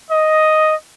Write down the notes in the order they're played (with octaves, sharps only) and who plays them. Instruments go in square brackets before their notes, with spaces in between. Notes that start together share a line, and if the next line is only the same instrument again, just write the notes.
[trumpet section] D#5